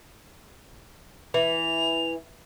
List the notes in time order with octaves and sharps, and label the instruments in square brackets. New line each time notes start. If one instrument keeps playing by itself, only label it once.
[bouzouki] E3 [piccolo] F7